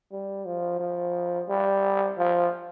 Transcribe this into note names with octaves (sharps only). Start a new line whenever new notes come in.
G3
F3
F3
G3
F3